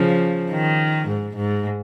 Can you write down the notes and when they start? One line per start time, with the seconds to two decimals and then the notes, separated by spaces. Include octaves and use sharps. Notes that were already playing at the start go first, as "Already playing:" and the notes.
Already playing: C#3 F3
0.51 D#3
1.08 G#2
1.36 G#2